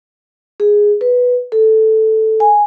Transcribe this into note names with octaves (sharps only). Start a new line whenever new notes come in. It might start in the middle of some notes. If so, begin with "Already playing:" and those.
G#4
B4
A4
G#5